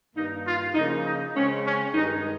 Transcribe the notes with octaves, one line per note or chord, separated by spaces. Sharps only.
G2 D#3 A#3 D#4
F4
C#3 F3 A#3 D#4
D#4
C#3 G#3 C4 C#4
C#4
G2 D#3 G#3 D#4